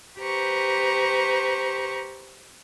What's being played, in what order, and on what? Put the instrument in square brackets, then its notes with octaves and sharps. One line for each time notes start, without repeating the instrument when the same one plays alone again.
[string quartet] G4 B4 C5 A#5 C#6